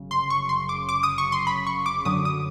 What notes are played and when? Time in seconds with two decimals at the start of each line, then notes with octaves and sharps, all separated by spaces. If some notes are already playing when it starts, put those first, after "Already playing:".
Already playing: G1 F#2 C#3
0.11 C6
0.30 C#6
0.49 C6
0.69 D6
0.89 D6
1.03 D#6
1.18 C#6
1.32 C6
1.47 B5
1.67 C#6
1.86 D6
2.05 F#2 D3 F#3 D#6
2.25 D#6